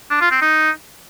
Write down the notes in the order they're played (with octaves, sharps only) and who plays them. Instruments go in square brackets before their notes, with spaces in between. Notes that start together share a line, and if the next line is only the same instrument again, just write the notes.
[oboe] D4
F4
C4
D#4